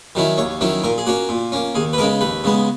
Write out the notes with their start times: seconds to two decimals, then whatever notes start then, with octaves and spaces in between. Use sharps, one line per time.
0.15 D#3 F#3 C#4 E4
0.38 D#2 C#5
0.61 D#3 F#3 C#4 E4
0.84 A#2 A#4
0.98 G#4
1.06 A#3 C#4 F#4
1.29 A#2
1.52 A#3 C#4
1.75 D#2 G#4
1.93 B4
1.98 C#3 G#3 B3 A#4
2.21 D#2 B4
2.44 C#3 G#3 B3